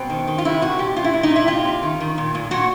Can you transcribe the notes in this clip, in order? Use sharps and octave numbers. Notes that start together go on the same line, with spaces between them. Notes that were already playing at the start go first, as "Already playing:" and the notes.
Already playing: B2 C4
D#3
D#3
F4
C3 E4
C3 F#4
A#2 G4
A#2 F4
E4
A#2
D#4
A#2 E4
C3 F4
C3
D#3
D#3
A#2
A#2
A#2 F#4